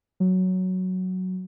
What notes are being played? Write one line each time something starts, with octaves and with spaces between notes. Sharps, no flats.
F#3